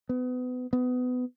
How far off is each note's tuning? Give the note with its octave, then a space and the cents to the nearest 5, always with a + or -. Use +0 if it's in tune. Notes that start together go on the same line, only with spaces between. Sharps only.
B3 +30
B3 +25